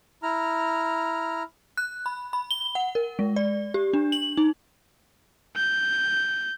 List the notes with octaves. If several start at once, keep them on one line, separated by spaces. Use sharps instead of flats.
E4 A#5 F6
F#6
B5
B5
G7
F#5
A#4
G#3
D5
G4
D4
F#7
D#4
G6